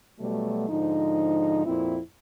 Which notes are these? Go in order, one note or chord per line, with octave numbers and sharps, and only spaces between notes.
B2 F#3 G3 A3
G#2 D3 F3 D#4
F2 A#2 C4 E4